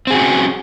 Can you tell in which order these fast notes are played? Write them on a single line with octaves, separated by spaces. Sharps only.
C4 G#4 F#4 C#4